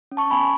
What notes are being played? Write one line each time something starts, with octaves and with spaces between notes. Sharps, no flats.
C#4
A5 C#6
B3 G#5 B5